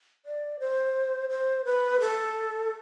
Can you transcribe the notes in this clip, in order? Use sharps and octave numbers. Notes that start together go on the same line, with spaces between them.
D5
C5
C5
B4
A4